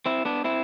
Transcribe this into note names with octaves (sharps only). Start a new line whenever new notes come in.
C4 E4
B3 D4
C4 E4